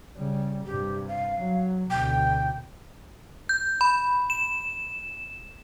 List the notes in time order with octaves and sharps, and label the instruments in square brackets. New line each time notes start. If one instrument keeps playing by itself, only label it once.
[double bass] C#3 G3
[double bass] G2 C3 [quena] G4
[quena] F5
[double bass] F#3
[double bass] D2 B2 [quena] G5
[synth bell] G6
B5
E7